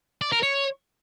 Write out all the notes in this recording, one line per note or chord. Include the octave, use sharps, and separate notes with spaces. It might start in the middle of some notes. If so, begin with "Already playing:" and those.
D5
A#4
C#5